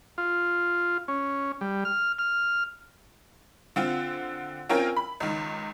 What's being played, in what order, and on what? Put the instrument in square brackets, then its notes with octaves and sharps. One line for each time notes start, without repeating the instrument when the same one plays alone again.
[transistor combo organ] F4
C#4
G3
F6
F6
[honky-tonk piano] D3 C4 F4
C4 C#4 F4 A#4 G5 G#5
B5
C#2 D#3